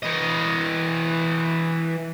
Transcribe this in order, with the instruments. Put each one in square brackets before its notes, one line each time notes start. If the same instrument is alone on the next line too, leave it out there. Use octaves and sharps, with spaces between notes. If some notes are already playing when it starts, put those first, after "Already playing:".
[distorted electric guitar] E3 D#5